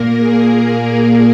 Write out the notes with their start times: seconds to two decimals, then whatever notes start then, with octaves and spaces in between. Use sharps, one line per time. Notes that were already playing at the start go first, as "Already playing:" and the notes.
Already playing: A#2 A#3 A#4
0.19 G#4
0.52 A#4